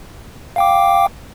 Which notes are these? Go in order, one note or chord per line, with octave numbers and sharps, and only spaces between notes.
F5 G5 D6